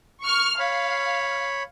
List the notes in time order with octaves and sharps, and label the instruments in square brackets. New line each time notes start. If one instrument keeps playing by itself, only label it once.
[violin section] C#6 F6
[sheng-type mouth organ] C#5 B5 [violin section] F5